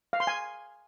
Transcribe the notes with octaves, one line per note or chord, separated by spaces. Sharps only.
F5
C6
G#5